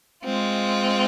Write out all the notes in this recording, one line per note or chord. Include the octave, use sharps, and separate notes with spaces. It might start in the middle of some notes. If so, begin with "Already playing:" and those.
G#3 C4 F4